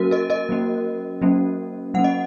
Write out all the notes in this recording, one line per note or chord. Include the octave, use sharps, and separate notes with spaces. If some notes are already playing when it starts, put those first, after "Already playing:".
Already playing: F#3 A#3 C#4 F#4 A#4
A#4 D#5
A#4 D#5
F#3 A#3 C#4
F#3 A#3 C#4
F#3 A#3 C#4 F#5
D#5